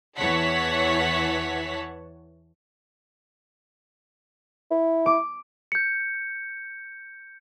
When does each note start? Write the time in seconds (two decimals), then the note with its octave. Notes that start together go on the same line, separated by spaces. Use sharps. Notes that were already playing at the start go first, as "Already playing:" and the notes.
0.18 E2 E3 C#5 F#5 A5 B6
4.71 E4
5.06 D6
5.72 G6 C#7